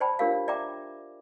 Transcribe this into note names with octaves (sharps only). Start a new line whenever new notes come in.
C5 D5 G5 A5 B5
D4 F4 G4 A#4 C#5 F5
D5 E5 G5 A#5 D6